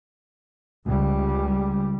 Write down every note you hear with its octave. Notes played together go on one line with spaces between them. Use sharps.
C#2 G3